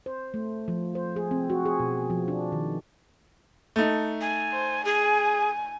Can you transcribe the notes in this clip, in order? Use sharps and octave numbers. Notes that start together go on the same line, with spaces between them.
C5
A3
F3
C5
G#4
C4
F#4
G#4
B2
F3
D4
D#3
A3 D#4
G#5
C5
G#4 G#5